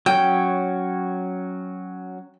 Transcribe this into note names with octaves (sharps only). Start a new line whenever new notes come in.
F#3 C#4 C#5 G5